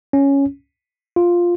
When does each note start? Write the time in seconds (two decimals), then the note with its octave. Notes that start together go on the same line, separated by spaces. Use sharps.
0.13 C#4
1.16 F4